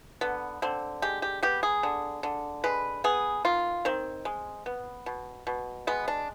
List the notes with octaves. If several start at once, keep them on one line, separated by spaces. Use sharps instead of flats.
D3 B3
D3 C4
G#3 G4
G4
B3 G4
G#4
D3
D3
G#3 B4
B3 G#4
D#3 F4
D#3 C4
G#3
B3
B2
B2
G#3 B3
D4